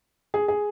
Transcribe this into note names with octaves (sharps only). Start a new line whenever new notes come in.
G#4
G#4